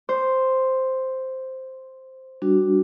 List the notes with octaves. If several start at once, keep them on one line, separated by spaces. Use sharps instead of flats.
C5
G3 D4 F#4